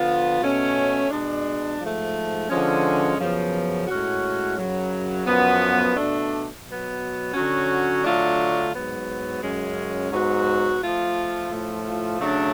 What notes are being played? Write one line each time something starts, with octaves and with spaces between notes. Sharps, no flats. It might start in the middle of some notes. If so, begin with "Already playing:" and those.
Already playing: D3 F3 B3 F4
B2 A3 C#4
B2 G#3 D4
G#2 F3 A3
D3 F3 G#3 C#4
F#2 C#3 F3 B3
A2 G#3 C#4 F#4
F#2 C#3 F#3
F#2 F3 B3
B2 A3 D4
B2 F#3 B3
D3 F#3 C#4 F#4
D3 F#3 A3 D4 F4
G#2 F#3 B3
F#2 C#3 G#3 C#4
G#2 F#3 B3 F#4
F3 A3 F4
A2 F3 A3 F4
C#3 F#3 A3 D4